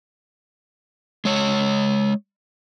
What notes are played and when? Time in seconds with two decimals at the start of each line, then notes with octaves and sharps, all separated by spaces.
1.25 G#3 C#5